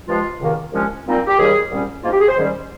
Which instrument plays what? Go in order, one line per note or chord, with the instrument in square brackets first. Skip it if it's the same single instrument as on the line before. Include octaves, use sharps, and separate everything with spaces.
[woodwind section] G2 F3 G#3 F4
C#2 C3 D#3 A#3
C2 A#2 F3 G#3 C#4
A#2 G3 C4 D#4
G4
D#2 D#3 G3 G#4
C2 A#2 G3 C#4
G#2 F3 A#3 D#4 F4
G4
G#4
C5
G#2 D#3 G3 C#4